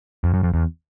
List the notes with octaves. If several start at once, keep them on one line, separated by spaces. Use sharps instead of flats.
F2
F#2
F2
E2